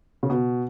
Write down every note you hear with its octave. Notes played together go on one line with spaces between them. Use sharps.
C#3
B2